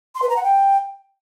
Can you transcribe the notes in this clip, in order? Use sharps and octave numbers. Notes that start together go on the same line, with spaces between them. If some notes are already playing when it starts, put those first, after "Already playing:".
C6
B4
A#5
F#5
G5